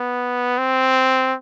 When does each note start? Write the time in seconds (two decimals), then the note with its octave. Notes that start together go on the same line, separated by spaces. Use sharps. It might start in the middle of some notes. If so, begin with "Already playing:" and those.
Already playing: B3
0.58 C4